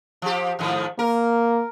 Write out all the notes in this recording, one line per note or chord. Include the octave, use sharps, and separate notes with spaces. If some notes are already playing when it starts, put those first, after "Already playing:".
F3 G4
G#2 D#3 F3
A#3 A#4